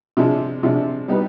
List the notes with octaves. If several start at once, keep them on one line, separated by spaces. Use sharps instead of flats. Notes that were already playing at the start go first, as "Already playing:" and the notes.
C3 F3 G#3 D4
C3 F3 G#3 D4
G3 B3 D#4 G4 B4